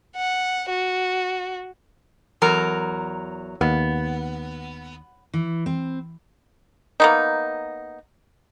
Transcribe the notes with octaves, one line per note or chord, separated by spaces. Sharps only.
F#5
F#4
E2 F#3 A#4
D#2 B3
E3
C4
A#3 B3 D#4